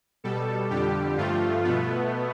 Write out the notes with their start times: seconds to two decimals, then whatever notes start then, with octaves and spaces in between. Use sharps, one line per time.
0.24 B2 G3 A4
0.70 F2 D3 G3 G4
1.17 G2 F3 A3 F4
1.64 B2 A3 B3